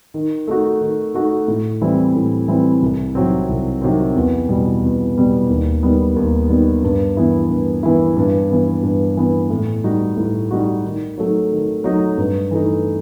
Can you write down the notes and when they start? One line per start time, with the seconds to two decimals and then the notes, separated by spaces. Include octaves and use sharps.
0.14 D#3
0.47 A3 D#4 F#4
0.81 D#3
1.15 A3 D#4 F#4
1.48 A2
1.82 E3 G3 C4 E4
2.15 A2
2.48 E3 G3 C4 E4
2.82 C2
3.15 C3 D#3 F#3 C4
3.49 C2
3.82 C3 D#3 F#3 C4
4.16 E2
4.49 B2 G3 B3
4.82 E2
5.16 B2 G3 B3
5.50 D#2
5.82 D#3 G3 B3
6.16 D#2
6.49 D#3 G3 B3
6.83 G2
7.17 E3 B3 E4
7.49 G2
7.83 E3 B3 E4
8.17 G2
8.50 E3 B3
8.83 G2
9.17 E3 B3
9.50 A2
9.84 G3 D#4 F#4
10.17 A2
10.51 G3 D#4 F#4
10.85 D#3
11.18 F#3 A3 D#4
11.52 D#3
11.84 F#3 A3 D#4
12.18 G2
12.51 E3 A3 D#4